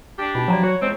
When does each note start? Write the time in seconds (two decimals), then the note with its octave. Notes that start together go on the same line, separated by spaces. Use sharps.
0.19 D4 G4
0.35 B2 D#4 F4 B5
0.48 F3 F#3 D5 A#5 B5
0.64 F#4 C#5
0.82 E2 G#3 C4